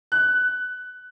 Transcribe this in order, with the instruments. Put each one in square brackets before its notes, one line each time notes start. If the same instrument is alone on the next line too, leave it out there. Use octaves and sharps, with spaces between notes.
[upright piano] F#6